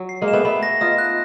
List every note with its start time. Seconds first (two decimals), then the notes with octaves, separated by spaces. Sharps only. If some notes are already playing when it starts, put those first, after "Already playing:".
Already playing: F#3
0.09 C7
0.21 G#3 A#3
0.28 E7
0.33 A3 B3
0.45 A3 B3 B5
0.63 A#6
0.81 D#4 F4 D#6
0.98 F#6